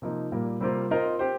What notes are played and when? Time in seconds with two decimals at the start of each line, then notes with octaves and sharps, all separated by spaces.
0.02 C3 F3 A#3 D#4
0.32 A#2 G3 A#3
0.60 C3 G3 A#3 F4 C5
0.91 C4 F4 A#4 D#5
1.19 C4 G4 C5